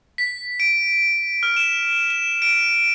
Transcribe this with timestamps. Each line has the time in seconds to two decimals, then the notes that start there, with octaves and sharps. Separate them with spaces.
0.18 B6
0.60 D7
1.43 F6
1.57 E7
2.10 E7
2.42 D7